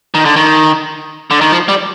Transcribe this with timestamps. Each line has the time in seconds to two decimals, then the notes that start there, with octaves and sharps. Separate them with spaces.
0.14 D#3
0.25 D3
0.36 D#3
1.31 D3
1.41 D#3
1.52 F3
1.68 G3